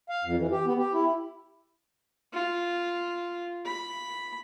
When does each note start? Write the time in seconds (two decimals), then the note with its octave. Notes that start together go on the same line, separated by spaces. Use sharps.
0.09 F5
0.24 F2
0.39 E3
0.51 G4
0.66 B3
0.77 G4
0.94 E4
2.33 F4
3.66 B5